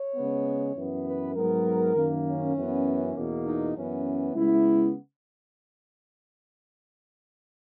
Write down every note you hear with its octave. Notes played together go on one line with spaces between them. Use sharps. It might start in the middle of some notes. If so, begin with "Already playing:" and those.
Already playing: C#5
C#3 G#3 B3
F#2 E3 B3
B4
G#2 F#3 B3 A#4
F#2 D#3 A#3
C#4
F#2 E3 B3
E2 B2 A#3
D#4
F#2 E3 B3 C#4
C#3 G#3 B3 E4